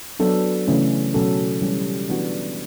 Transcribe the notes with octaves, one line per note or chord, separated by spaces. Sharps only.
F#3 B3 D4 A4
C#3 E3 A3 C#4
B2 F#3 C#4 F#4 A4
E3 G3 C#4
E3 B3 D4 F#4